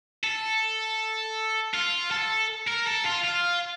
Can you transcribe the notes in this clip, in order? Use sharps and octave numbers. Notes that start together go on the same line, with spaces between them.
A4
F4
A4
A#4
A4
F4
F4